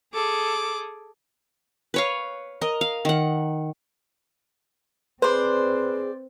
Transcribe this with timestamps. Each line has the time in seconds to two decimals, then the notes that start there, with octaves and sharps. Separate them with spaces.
0.14 G#4 A4 D6
1.94 B4 C#5 F5
2.61 A#4 D#5
2.81 F5
3.05 D#3 F#5
5.22 C4 G#4 B4 C5 D5 C6